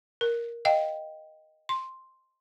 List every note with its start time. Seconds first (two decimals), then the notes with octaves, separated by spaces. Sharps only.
0.21 A#4
0.65 D#5 F5 G5
1.69 C6